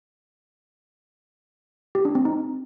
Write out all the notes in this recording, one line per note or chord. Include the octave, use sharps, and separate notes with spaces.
G4
D4
C4
D#4